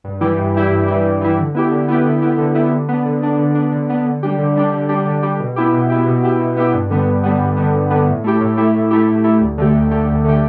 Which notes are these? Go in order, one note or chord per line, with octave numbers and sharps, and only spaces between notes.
G2
E3 G3 E4 G4
G2
E3 G3 E4 G4
G2
E3 G3 E4 G4
G2
E3 G3 E4 G4
D3
B3 E4 G4
D3
B3 E4 G4
D3
B3 E4 G4
D3
B3 E4 G4
D3
B3 D4
D3
B3 D4
D3
B3 D4
D3
B3 D4
D3
G3 D4 G4
D3
G3 D4 G4
D3
G3 D4 G4
D3
G3 D4 G4
B2
B3 E4 G4
B2
B3 E4 G4
B2
B3 E4 G4
B2
B3 E4 G4
G2
D3 G3 B3
G2
D3 G3 B3
G2
D3 G3 B3
G2
D3 G3 B3
A2
A3 E4 G4
A2
A3 E4 G4
A2
A3 E4 G4
A2
A3 E4 G4
D2
D3 A3 G4
D2
D3 A3 G4
D2
D3 A3 G4